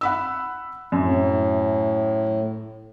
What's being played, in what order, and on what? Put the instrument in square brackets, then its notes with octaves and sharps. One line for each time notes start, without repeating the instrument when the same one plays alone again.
[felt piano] F#5 B5 E6
[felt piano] F#2 [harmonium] A2